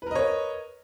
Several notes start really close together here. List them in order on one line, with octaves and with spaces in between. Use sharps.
B4 A#4 D#5 C#5